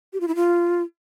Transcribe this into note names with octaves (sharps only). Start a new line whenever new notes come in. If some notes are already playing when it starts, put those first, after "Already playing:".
G4
F4
E4
F4